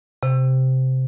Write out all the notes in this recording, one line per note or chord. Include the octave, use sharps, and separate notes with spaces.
C3